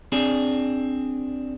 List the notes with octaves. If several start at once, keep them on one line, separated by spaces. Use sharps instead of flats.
C4 D4 G#4